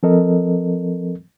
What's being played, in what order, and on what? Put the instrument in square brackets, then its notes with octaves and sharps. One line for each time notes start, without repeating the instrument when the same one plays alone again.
[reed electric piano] F3 C4 A4 A#4 D#5